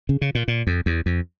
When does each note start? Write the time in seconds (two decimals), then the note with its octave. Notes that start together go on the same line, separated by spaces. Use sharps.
0.09 C#3
0.21 C#3
0.35 A#2
0.48 A#2
0.67 F2
0.86 E2
1.06 F2